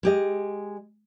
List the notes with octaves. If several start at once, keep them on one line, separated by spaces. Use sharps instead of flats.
G#3 G4 D#5